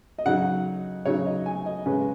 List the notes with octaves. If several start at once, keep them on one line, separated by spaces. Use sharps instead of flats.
D#5
C#3 F#3 D#4 F#5
C#3 F#3 D#4 C#5
D#5
G#5
D#5
C#3 G#3 C#4 B4